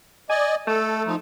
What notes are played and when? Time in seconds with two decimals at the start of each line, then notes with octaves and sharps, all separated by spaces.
0.30 D5 D#5 G#5
0.67 A3 A4
1.06 F3 D#4